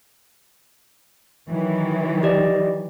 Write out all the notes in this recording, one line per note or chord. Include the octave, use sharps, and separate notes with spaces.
D#3 E3 F#3
G4 D5 D#5